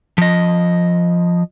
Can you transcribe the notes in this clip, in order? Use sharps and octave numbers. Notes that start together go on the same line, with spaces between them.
F3 D#5